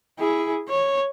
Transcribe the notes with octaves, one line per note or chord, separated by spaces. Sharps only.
E4 G#4
C#5